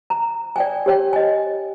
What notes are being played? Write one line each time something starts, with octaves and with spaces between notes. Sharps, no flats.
A#5
D5 G5 G#5
G4 C#5 G5
D#5 G#5